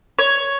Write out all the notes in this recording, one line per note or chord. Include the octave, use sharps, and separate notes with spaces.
C#5